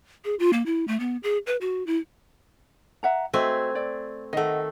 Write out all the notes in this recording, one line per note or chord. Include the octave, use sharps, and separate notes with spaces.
G#4
F4
A#3
E4
A3
B3
G#4
B4
F#4
E4
E5 F#5 A#5
A3 C4 F#4 D#5 E5 G#5
D5
D#3 A3 D#5 F#5